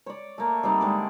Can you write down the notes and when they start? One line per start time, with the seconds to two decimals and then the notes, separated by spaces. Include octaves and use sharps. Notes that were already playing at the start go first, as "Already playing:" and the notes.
0.06 C#5 D5
0.38 A3 A#3
0.63 G3 C4 D#4 D5
0.81 D3 G#3 C4